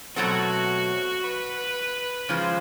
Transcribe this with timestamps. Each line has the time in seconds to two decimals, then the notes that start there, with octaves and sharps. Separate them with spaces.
0.16 B2 F#3 A3 C4 F#4
1.23 B4
2.28 C#3 F3 G#3 C5